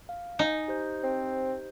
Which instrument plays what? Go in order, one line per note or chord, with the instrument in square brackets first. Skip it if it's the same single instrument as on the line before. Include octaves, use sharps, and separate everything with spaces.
[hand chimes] F5
[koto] D#4 [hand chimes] G#5 A#5
[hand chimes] G4 C5 G6
[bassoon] C4